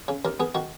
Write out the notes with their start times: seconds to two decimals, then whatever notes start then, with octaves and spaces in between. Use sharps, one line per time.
0.08 C#3
0.25 D#2 A#4
0.40 B3 G#4
0.55 D#3 F#4